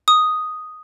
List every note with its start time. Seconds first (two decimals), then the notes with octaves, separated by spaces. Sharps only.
0.08 D#6